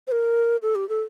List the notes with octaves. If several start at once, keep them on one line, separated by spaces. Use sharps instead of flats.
C5
A#4
A4
G4
A4